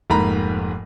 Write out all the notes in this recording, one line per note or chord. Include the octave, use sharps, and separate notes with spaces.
F1 G#2 A#3 A#5 B5